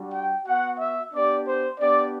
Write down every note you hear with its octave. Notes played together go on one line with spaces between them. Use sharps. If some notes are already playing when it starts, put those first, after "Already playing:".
Already playing: G3 D4 F#4
G5
B3 F#4 F#5
E5
B3 D4 G4 D5
C5
B3 D4 G4 D5